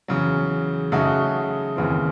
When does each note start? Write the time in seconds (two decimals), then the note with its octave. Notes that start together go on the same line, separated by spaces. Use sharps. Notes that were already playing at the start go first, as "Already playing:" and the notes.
0.08 E2 C#3 F#3
0.92 C#3 F#3 A3 D#4 F#4
1.76 D#2 C#3 E3 C4